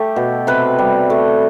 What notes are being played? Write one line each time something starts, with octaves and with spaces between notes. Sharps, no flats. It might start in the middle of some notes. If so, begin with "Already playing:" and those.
Already playing: A3 G4 A4
B2
C3 B4
G3
A3